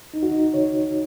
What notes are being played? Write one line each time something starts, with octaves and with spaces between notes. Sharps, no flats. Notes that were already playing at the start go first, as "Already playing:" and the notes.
C#2 D#4
F#4
D#4
C#3 C#5